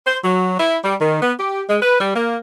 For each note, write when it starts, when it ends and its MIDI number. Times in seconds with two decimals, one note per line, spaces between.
0.07 0.19 72
0.25 0.59 54
0.60 0.78 64
0.85 0.96 55
1.01 1.20 51
1.22 1.33 59
1.40 1.64 67
1.69 1.78 56
1.82 1.98 71
2.01 2.13 55
2.16 2.37 58